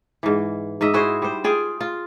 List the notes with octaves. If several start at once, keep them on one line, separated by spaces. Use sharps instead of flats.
G#2 E3
G#2 D#5 E5
E4 F#4 G#4 C5
G3 C5
F4 G#4 G5
F4